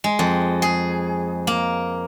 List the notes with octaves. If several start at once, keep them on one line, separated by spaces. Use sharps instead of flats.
G#3
F2
G#4
A#3